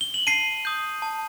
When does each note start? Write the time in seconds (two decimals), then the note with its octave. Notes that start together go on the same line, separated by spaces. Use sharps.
0.01 G7
0.14 F#7
0.27 A5 C7 D#7
0.65 D#6 G6
1.02 A5